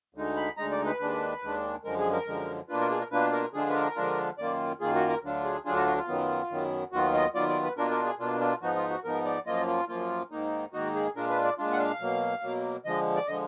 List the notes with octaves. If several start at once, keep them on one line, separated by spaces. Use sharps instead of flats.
D2 D3 G#3 D#4
B5
D2 D3 G#3 D#4 A#5
D5
B4
D#2 D#3 G#3 D4
D#2 D#3 G#3 D4
F#2 D3 F3 G#3 A#4
G#4
A#4
F#2 D3 F3 G#3
B2 A#3 D4 F4 B4
A#4
G#4
A#4
B2 A#3 D4 F4 B4
A#4
D3 F3 G#3 D4 F4 G#4
B4
A#4
D3 F3 G#3 D4 F4
F#2 D#3 A#3 F4 D5
F#2 D#3 A#3 F4 G#4
F#4
A#4
D2 D3 F#3 D4 F4
G#4
D2 D3 F#3 D4 F4 G#4
F#4
F#4
F4
F#2 D#3 F#3 B3
F#2 D#3 F#3 B3
D#2 D#3 F#3 B3 F4 F#4
D#5
D#2 D#3 F#3 B3 F4 D5
D5
B4
B2 A#3 D4 F4 A#4
A#4
G#4
B2 A#3 D4 F4
F4
G#2 F3 B3 D#4 F#4
F4
F#4
G#2 F3 B3 D#4 A#4
D5
F#2 F3 A#3 F4 D#5
F4
F#2 F3 A#3 F4
G#2 D#3 A#3 D#4
G#2 D#3 A#3 D#4 F#4
G#4
A#2 G#3 D4 F4 A#4
B4
D5
A#2 G#3 D4 F4
F#5
F5
B2 F#3 A#3
B2 F#3 A#3
D3 F3 G#3 D#5
D5
D3 F3 G#3 D#5